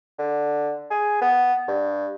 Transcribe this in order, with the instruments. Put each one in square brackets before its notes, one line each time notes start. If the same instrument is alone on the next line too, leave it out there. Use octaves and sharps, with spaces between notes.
[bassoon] D3
G#4
B3
G2